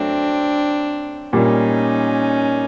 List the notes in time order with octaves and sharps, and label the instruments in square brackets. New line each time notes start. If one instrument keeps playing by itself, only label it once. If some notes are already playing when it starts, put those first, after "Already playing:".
Already playing: [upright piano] F#3 A3 [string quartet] C4 D4
[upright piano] A#2 G3 A#3 [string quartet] C#4 D#4